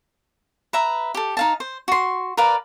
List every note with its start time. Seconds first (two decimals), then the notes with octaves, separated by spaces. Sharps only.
0.73 B4 E5 A#5
1.14 G4 A4
1.37 D#4 F5 A5
1.60 C5
1.88 F#4 C6
2.37 A#4 B4 D5 F5